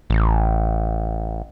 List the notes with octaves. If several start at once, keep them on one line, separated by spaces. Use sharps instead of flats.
A1